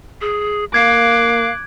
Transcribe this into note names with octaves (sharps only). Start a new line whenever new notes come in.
G#4
A#3 F5 D6 F#6 G#6